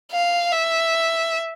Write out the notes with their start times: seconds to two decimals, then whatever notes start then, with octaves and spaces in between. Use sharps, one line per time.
0.12 F5
0.52 E5